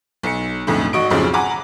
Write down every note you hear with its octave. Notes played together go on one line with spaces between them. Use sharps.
B1 C#7
B1 F2 A2 D3
G#1 F#4 D#5 C#6 D7
B1 F2 G#2 C#3 F3
F#5 G#5 A#5 B5 D6